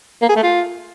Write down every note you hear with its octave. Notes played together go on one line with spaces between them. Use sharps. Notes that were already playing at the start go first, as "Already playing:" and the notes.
A#3
G#4
A3
F4